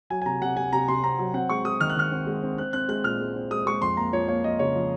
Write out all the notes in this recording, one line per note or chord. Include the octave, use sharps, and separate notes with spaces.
F#3 G#5
G#5
C3 A#5
C3 F#5
C3 G#5
C3 A#5
C3 C6
C4 A#5
F#3
C4 F#5
G#3 C#6
G#3 D#6
D#3 F6
F#6
D#3 F6
C4
G#3
C4
C4 F#6
C4 F#6
G#3 F#6
A#2 F6
G#3
C4
G#3 D#6
G#3 C#6
F2 C6
A#3 A#5
F3 C#5
A#3 C#5
F3 D#5
C#3 C#5
F3